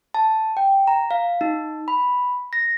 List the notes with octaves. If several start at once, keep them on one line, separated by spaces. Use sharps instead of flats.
A5
G5
A#5
F5
D#4
B5
A#6